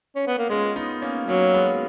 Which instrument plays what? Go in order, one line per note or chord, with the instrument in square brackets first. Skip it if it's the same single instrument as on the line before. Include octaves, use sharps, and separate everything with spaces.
[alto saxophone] C#4
B3
A#3
[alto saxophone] G#3 [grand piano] C#4 F4
[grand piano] B3 D#4
A#3 C#4
[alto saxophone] F#3 [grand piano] A#3 C#4
[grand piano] G#3 B3